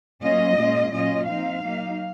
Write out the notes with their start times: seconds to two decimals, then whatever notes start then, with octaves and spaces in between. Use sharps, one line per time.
0.21 F#3 A#3 C#4 F4 D#5
0.57 A#2 G#3 C#4 F4
0.91 A#2 F#3 C#4 F4 D#5
1.26 F3 C4 D#4 F5
1.62 F#3 A#3 D#4